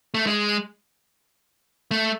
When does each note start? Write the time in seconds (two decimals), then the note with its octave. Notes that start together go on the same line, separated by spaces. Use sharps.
0.14 A3
0.27 G#3
1.91 A3